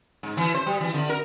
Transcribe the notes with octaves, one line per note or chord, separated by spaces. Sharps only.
G#2
E3
C5
G3
E3
D3
A#4